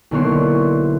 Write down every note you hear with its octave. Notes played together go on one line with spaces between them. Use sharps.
B1 D3 A#3 E4 C#5 C6